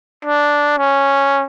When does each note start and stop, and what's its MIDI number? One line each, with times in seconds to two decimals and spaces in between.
0.25 0.74 62
0.79 1.45 61